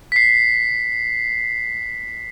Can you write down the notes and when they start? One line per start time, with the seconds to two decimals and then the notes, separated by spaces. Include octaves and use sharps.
0.12 B6 C7